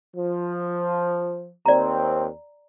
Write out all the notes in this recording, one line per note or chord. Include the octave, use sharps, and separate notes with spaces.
F3
D#2 C4 D5 A#5